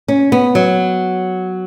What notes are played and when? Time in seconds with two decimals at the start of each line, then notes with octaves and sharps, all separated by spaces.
0.08 C#4
0.32 B3
0.55 F#3